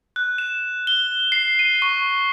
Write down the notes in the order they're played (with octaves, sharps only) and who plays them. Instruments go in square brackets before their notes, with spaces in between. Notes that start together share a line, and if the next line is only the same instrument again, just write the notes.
[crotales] F#6
E7
G7
C7
D#7
C#6